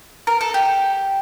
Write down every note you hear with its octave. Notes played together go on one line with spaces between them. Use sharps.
A#4
A4
G4